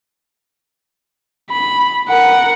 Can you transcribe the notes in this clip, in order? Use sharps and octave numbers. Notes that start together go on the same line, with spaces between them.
B5
A#4 F#5